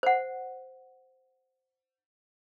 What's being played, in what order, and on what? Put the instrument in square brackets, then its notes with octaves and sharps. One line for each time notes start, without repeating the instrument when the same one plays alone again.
[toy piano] C5 F#5